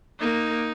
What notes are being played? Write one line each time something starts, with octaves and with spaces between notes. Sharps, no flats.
A#3 D#4